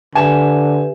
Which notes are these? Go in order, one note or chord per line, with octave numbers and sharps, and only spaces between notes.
D3 G4 B4 E5 G#5